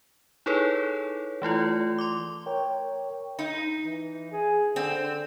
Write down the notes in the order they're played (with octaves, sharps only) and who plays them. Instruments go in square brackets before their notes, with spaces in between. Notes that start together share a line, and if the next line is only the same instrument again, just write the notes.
[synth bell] D#4 E4 G#4 A4 B4 C#5
E3 A3 E4 F4
C6 D6
[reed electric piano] A#4 C#5 G5
[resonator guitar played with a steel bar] D#4
[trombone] E3
G#4
[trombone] D3 [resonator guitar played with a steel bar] C4